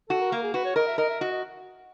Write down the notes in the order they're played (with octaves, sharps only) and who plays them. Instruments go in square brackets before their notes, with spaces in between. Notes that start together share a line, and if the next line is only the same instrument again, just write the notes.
[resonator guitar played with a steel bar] F#4 [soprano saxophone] A4
[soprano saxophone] A#4
[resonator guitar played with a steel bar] A#3 [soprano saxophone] A#4
[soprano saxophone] G#4
[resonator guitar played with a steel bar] F#4 [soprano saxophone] B4
[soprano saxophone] C#5
[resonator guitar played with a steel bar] A#4 [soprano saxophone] D#5
[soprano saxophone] E5
[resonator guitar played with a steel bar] A#4 [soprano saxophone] D#5
[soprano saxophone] E5
[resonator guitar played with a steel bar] F#4 [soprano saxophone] D#5
[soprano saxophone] D#5